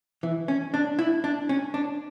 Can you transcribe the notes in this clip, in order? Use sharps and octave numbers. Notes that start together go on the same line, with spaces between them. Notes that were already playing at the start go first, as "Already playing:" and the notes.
E3
C#4
D4
E4
D4
C#4
D4